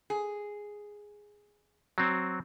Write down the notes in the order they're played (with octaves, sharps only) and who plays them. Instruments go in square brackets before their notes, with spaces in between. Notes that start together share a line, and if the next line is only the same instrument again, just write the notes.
[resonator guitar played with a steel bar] G#4
[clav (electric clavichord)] F#3 C4